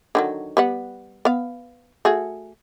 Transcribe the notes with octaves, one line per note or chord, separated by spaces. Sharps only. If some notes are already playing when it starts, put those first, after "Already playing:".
D3 D#3 F#3
G3 B3 F#5
B3 F5
A3 F#4 G#4